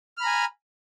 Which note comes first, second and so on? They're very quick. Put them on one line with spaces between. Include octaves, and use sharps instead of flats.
F6 B5 A#5 G#5